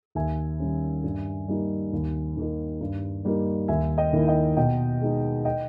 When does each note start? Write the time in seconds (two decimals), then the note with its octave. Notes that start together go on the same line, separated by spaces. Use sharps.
0.15 D#2 E5 G#5
0.60 D#3 G3 C#4
1.04 G2
1.48 G3 A#3 D#4
1.93 D#2
2.37 D#3 A#3 D#4
2.81 G2
3.25 G3 A#3 D#4
3.68 D#2 E5 G#5
3.98 D#5 G5
4.13 D#3 A#3 E4
4.28 D#5 G5
4.57 B2 D#5 G5
5.02 G#3 D#4
5.45 D#5 G5